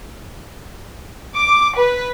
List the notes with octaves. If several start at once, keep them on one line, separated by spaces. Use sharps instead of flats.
D6
B4